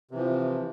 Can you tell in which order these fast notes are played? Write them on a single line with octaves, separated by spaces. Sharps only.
C3 E3 F3